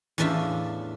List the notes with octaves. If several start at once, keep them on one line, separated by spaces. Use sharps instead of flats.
E2 A2 C#4 D4 F4 E5